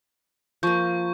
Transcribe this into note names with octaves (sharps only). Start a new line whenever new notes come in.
F3 A#3 C#6 G6